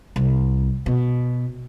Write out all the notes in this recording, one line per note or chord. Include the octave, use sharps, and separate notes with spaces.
C2
B2